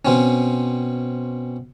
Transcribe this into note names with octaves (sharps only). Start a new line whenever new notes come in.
B2 C4 C#4